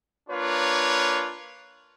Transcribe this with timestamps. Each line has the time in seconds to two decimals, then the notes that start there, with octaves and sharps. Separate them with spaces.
0.29 A#3 D4 F4 B4 C#5